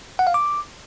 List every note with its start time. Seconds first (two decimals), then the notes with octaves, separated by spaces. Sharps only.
0.19 F#5
0.27 F5
0.34 D6